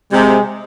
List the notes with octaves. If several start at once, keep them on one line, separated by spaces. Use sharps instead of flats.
C3 G#3